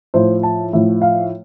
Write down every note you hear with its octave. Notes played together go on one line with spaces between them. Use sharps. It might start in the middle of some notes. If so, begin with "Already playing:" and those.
A2 F3 C5
A5
A2 F3
F5